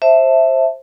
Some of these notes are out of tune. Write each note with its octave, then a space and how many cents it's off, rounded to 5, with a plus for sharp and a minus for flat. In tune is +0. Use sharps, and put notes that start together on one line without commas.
C5 +20 E5 +0 A5 +0